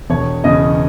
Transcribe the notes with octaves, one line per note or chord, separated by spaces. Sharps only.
E1 C#5
E2 C#3 E3 D#5